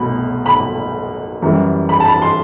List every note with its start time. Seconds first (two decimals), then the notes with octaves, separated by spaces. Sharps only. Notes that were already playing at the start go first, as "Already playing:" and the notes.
Already playing: C2 B2 A3 B5
0.46 B5
1.42 F#2 E3 G3
1.89 B5
2.00 A5
2.05 B5
2.22 C6